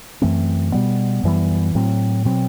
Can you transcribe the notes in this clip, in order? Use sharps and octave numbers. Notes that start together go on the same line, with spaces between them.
F#2 E3 A3 C4
B2 G3 B3
F#2 E3 G3 B3
A2 F#3 C4
B2 F#3 C4